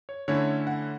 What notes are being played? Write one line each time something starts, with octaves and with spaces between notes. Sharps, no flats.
C#5
D3 A3 C#4 E4 C#5
F#5